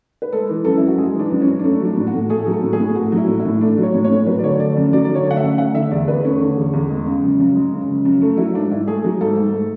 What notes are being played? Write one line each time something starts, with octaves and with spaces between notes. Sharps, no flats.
B4
G#3 A4
E3
F#2 A4
F#2 E4
F#4
G#3 G#4
E3 D4
F#2
C#4
F#2
D4
A3 C#4
F#3 D4
A2
F#4
A2
A3 G#4
F#3
A4
A2
G#4
A2
A3 F#4
F#3
E4
A2
E4
A2
A3 D4
F#3
C#5
A2
C#5
A2
F#3 B4
D5
D3 C#5
A3 D5
F#2
F#3 D5
D3 D5
C#5
A3 F#5
E5
F#2
A3 F#5
D3 E5
E2 D5
E2 B4
A3 C#4
D3
E2
E2
G#3
C#3
F#2
F#2
G#3
C#3
F#2
F#2
A3
F#3 E4
G#2 D4
G#2 E4
A3 G#4
F#3
G#2 A4
G#2
A3